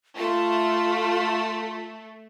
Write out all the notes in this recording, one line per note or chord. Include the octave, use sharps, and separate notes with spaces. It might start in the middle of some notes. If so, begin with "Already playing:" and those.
A3 F4